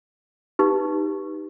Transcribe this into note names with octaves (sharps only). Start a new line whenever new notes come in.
D#4 G4 B4